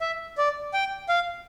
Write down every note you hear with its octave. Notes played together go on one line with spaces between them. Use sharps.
E5
D5
G5
F5